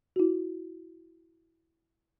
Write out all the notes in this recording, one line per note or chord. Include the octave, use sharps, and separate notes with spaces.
E4 F#4